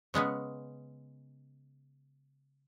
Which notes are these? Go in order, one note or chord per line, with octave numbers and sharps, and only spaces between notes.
C#3 G#3 B3 C#4